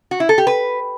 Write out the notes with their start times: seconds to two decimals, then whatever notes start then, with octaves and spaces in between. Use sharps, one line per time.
0.11 F#4
0.20 E4
0.29 A4
0.38 G4
0.47 B4